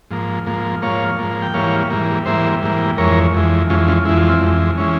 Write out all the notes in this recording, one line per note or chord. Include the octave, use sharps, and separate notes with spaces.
G#2 F3 A#3
G#2 F3 A#3
G#2 F3 A#3 C#5 F5
G#2 F3 A#3
G5
G#2 E3 G3 A#3 C#5 F5
G#2 E3 G3 A#3
G#2 E3 G3 A#3 C5 E5
G#2 E3 G3 A#3
F2 E3 G#3 A#4 C#5
F2 E3 G#3
F2 E3 G#3 C#4 F4
C#4 F4
F2 E3 G#3 E4
F4
C4 E4
F2 E3 G#3
E3 G#3 C#4